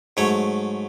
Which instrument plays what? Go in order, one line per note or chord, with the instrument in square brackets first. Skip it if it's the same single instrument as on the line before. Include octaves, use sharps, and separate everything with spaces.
[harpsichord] G#2 F#3 A3 C#5